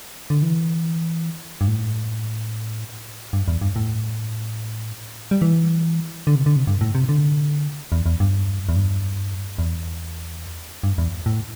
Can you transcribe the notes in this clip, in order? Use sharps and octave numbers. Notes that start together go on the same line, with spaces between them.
D3
E3
G2
A2
G2
E2
G2
A2
G3
E3
D3
C3
D3
C3
G2
A2
C3
D3
E2
E2
G2
E2
G2
E2
G2
E2
A2